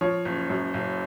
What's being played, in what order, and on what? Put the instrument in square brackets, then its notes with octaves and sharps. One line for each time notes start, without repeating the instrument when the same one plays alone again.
[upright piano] F3 C#5
F#1
F#2
F#1